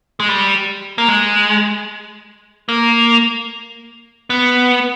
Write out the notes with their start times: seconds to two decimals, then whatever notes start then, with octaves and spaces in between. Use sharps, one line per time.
0.20 G#3
0.29 G3
0.98 A#3
1.08 G#3
2.69 A#3
4.30 B3